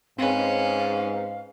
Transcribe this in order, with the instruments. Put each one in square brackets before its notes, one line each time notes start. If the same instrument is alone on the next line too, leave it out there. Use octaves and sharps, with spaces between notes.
[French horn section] G#2 [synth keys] C4 B4 [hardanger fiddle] C#4 [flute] F5